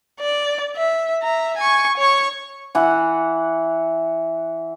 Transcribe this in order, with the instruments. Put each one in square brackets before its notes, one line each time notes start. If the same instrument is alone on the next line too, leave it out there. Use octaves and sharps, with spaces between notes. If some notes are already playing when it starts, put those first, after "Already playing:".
[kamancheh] D5
E5
E5 A#5
G#5 C#6
C#5 C#6
[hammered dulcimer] E3 F#5